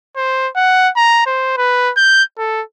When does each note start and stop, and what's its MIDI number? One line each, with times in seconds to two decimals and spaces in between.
0.17 0.49 72
0.56 0.90 78
0.96 1.23 82
1.26 1.54 72
1.57 1.92 71
1.97 2.23 91
2.38 2.63 69